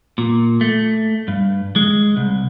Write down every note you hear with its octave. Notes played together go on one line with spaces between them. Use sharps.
A#2
A3
G2
G#3
C2